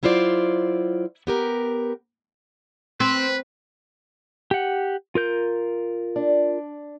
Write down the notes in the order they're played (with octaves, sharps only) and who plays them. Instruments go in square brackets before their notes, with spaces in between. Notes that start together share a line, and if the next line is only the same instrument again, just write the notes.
[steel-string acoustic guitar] F#3 E4 F4 C5 D5
B3 G4 A#4
[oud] C4 [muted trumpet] B4
[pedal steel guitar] G4 F#5
F4 A#4 G6
[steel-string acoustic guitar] D4